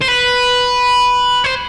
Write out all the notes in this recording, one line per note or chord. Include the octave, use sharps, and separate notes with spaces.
C5
B4
C5